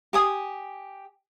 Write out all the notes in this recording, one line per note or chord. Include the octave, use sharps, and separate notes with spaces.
G4 G#5 D#6